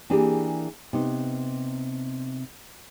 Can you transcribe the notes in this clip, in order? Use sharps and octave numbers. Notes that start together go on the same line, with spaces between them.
E3 A#3 D4 G4 G#4
C3 B3 D#4